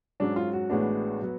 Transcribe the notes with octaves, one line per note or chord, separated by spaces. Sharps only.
G#2 F#3 C#4 D4
F4
F#4
A1 A2 G#3 B3 D4
F#3 B3